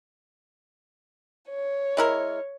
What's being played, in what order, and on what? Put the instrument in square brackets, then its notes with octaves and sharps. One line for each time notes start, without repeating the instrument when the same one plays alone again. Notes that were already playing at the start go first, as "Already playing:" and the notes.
[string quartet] C#5
[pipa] G#3 E4 A#4